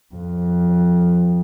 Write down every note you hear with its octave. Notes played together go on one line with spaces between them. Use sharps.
F2